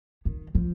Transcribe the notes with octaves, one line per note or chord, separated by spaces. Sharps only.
D#3
F3